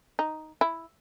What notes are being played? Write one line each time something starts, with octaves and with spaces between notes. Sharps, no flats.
D#4
E4